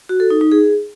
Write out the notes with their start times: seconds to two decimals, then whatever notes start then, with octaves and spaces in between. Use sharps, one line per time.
0.09 F#4
0.20 A4
0.30 D#4
0.41 D#4
0.52 G#4